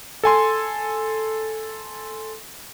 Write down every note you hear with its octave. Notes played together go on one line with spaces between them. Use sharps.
A4 G#5 C6